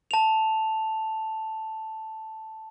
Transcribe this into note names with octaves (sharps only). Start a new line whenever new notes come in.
A5 F7